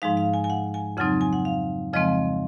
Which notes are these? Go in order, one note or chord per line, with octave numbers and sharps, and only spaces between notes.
G#2 F3 G#3 D#4 F5
F5
G#5
G#5
F#5
G#5
F2 C#3 F#3 C4 D#4 F#5
G#5
F#5
F5
F2 C#3 F3 G#3 C4 D#5